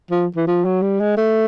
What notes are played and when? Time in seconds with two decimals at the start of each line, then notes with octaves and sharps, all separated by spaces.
0.11 F3
0.36 E3
0.47 F3
0.65 F#3
0.82 G3
1.00 G#3
1.17 A3